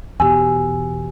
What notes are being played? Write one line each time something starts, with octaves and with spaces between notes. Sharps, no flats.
E2 B2 G4 G#5 E6